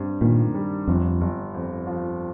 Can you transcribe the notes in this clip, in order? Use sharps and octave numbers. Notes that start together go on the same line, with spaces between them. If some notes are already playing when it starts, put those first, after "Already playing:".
Already playing: G2 C4
A#2 D#3
G3
G1 F2
G1
F2
F3